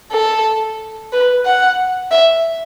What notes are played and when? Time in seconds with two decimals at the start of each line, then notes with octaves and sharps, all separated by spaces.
0.12 A4
1.12 B4
1.45 F#5
2.11 E5